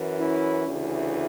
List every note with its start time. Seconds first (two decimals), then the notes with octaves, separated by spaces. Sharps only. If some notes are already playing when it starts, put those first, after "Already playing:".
Already playing: F#2 E3
0.20 C#4 E4
0.66 D2 C#3 E3